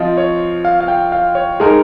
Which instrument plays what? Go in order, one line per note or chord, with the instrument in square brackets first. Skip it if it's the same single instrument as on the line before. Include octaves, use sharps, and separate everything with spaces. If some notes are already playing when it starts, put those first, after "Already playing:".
Already playing: [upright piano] F3 C4 F4 [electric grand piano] D#5
[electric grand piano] C#5
F5
F5
G5
F5
C#5
[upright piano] G#3 D#4 A#4